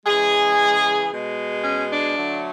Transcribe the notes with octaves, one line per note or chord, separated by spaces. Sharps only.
C#3 E3 G#3 G#4
B2 G#3
C#4
D4
D3 F#3 A3